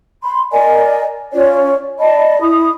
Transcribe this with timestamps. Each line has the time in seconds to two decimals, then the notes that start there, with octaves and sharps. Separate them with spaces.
0.23 B5 C6
0.52 A#4 D5 D#5 G#5
1.32 C#4 F4 C#5 D5
1.99 D5 D#5 A5 B5
2.41 E4 B5 D#6